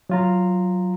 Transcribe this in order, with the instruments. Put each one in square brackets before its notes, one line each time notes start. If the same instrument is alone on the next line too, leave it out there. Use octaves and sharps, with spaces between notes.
[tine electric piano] F#3 F4 A#5